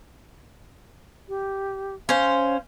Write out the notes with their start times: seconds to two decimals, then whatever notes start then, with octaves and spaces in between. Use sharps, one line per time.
1.29 G4
2.09 C#4 C5 F5